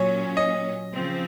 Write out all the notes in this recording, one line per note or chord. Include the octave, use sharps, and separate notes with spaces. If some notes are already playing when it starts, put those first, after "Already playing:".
Already playing: A#2 F#3 C#4 C#5
D#5
C#3 F3 C4